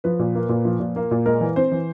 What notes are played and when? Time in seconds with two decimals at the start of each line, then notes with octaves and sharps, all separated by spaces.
0.04 F3 B4
0.19 A#2
0.35 A#3
0.49 A#2
0.65 F3
0.80 A#2
0.96 A#3
1.11 A#2
1.26 G#3 A#4
1.41 E3
1.56 C4 C5
1.72 E3